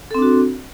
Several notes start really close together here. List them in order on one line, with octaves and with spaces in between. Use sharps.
A4 C4 D4 F#4